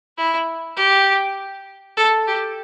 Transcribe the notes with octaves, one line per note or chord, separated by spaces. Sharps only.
E4
G4
A4
G4